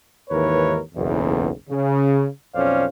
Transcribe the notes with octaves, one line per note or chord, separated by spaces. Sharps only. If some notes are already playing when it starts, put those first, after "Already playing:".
D#2 G#2 E3 A#4 B4 C#5
F#1 B1 E2
C#3
B1 F2 C#4 C5 D5 F5